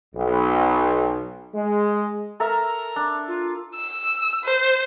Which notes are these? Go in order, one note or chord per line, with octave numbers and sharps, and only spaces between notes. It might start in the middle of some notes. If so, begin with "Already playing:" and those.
B1
G#3
A4 A#4 E5 A#5
D4
F4
E6
C5